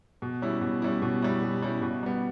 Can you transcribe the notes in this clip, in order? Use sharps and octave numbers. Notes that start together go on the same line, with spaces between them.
B2
G3 C#4 E4
B2
G3 C#4 E4
B2
G3 C#4 E4
B2
G3 C#4 E4
B2
G3 B3